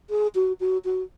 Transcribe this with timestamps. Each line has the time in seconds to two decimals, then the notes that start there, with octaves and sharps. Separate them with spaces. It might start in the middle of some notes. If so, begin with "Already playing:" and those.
0.10 G#4
0.35 F#4
0.60 F#4
0.85 F#4